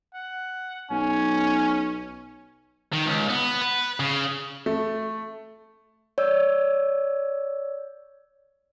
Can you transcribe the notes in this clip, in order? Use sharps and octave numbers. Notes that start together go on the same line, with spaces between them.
F#5
B1 C#4 G#5
D#3
C#2
B3
B4
C#3
A3
C#5 D5 E6